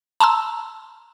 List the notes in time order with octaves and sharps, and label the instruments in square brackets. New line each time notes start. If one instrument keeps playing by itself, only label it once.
[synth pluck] A5 A#5 C6 E6